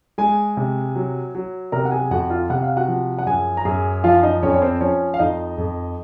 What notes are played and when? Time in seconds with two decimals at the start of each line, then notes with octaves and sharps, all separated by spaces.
0.18 G#3 G#4 G#5
0.57 C3
0.96 F#3
1.35 F#3
1.72 C3 A#4 A#5
1.85 F#5
1.91 G#4 G#5
2.11 F2 F#4 F#5
2.30 F4 F5
2.50 C3 F#5
2.63 F5
2.77 F#4 F#5
2.88 F3
3.19 F#5
3.26 F#2 G#4 G#5
3.57 A#5
3.65 F#2 G#4 G#5
4.04 F3 F4 F5
4.23 D#4 D#5
4.42 F2 C#4 C#5
4.55 C#5
4.62 C4 C5
4.81 F3 C#4 C#5
5.14 F5
5.19 F2 D#4 D#5
5.58 F2